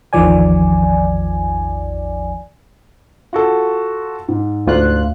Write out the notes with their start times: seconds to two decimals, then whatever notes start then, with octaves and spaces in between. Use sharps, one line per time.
0.13 A1 E2 D#3 F3 D5 G#5
3.33 F4 F#4 A4
4.28 G#2
4.67 D2 F4 F#6